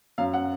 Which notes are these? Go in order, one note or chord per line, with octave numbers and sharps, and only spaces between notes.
F#2 F5
F#5